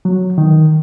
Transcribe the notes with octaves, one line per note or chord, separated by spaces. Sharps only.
F#3
D#3